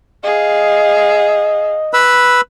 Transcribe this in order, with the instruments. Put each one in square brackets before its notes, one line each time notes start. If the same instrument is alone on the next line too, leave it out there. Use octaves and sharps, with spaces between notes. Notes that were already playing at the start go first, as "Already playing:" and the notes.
[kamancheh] G#4 F5 [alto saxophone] D#5
[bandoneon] B4 B5 E6